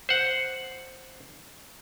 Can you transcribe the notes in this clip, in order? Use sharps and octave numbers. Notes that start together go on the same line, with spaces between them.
C5 F#5